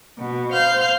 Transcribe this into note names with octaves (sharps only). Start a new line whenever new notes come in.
B2
C5 F5 F6 G6